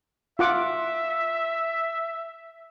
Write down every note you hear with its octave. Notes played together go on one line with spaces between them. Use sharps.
F4 E5 F#5 D6